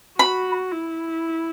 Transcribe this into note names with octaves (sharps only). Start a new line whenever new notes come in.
F#4 B5
E4